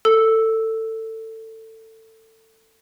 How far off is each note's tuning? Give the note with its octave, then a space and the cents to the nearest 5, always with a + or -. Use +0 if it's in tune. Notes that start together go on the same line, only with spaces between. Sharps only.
A4 +20 E6 +0